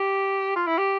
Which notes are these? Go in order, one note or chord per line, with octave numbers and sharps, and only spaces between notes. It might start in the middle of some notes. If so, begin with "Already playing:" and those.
Already playing: G4
F4
E4
G4